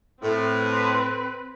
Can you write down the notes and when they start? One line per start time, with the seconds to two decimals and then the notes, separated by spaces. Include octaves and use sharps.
0.23 A2 C4 B4